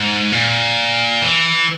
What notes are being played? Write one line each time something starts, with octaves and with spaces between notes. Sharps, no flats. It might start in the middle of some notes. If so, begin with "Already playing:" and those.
Already playing: G#2
A#2
E3